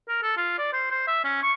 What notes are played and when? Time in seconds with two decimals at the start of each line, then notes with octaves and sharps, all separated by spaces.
0.08 A#4
0.23 A4
0.37 F4
0.58 D5
0.73 C5
0.91 C5
1.07 E5
1.24 C#4
1.43 C#6